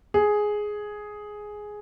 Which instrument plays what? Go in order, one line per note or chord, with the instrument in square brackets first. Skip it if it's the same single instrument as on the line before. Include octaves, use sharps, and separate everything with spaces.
[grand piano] G#4